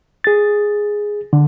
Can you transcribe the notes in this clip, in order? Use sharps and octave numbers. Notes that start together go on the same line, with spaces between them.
G#4 A6
D3